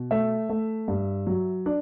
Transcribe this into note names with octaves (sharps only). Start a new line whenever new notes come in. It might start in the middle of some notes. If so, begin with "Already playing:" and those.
Already playing: B2
A3 E5
A3
G2
F#3
D4 D5